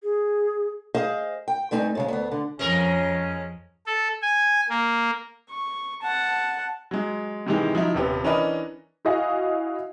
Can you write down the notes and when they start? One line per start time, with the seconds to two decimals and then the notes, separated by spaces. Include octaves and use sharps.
0.03 G#4
0.95 G#4 C5 D#5 F5
1.48 G5
1.71 G2 A3 C4 D#4 G#5
1.95 G#2 C#3 G#3
2.08 D2 B3
2.32 D3
2.59 F2 F3 G#3 C#4 A#4
3.87 A4
4.22 G#5
4.70 A#3
5.50 C#6
6.02 F#5 A5
6.91 F#3 G#3
7.47 G#2 C3 D#3 E3 G#3
7.75 F3 F#3 D#4 E4
7.94 D#1 C3 B3 C#4
8.24 E3 C#4 D4 A#4 B4 D#5
9.05 E4 F#4 D#5 F5 G#5